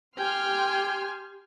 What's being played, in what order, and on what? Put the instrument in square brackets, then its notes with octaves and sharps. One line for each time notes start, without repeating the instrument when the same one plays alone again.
[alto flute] G4 [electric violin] G5 [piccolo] G#5 [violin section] C6 F6